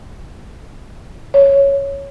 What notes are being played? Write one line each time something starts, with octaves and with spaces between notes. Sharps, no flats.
C#5